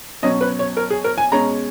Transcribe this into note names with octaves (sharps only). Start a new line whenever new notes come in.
B2 F#3 C#4 D#5
B4
C#5
A#4
G#4
A#4
G#5
B2 G#3 C#4 A#5